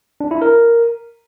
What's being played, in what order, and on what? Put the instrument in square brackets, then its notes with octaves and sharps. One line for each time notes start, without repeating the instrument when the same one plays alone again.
[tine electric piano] D4
E4
A#4